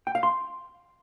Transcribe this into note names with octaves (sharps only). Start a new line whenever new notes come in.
G5
F5
C6